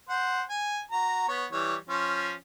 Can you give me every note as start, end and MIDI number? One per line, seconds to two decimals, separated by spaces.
0.09 0.42 72
0.09 0.42 78
0.50 0.80 80
0.91 1.26 66
0.91 1.26 82
1.28 1.45 59
1.28 1.45 73
1.52 1.75 52
1.52 1.75 55
1.52 1.75 73
1.89 2.33 53
1.89 2.33 61